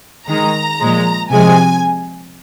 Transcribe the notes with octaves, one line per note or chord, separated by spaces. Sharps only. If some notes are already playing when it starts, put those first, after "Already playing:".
D#3 G#3 A#5
A#2 F3 G#3
C3 F3 G#3 G#5